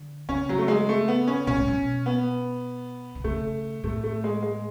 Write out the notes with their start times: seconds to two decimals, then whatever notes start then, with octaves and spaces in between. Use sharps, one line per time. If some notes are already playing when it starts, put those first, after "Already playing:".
Already playing: D3
0.29 C#3 C#4
0.49 F#3
0.59 A3
0.68 G#3
0.89 A3
1.08 B3
1.27 C#4
1.47 B2 C#4
1.58 A2
1.68 B2
2.06 B3
3.15 D3
3.24 C#3 A3
3.84 A2 A3
4.03 A3
4.24 G#3
4.42 G#3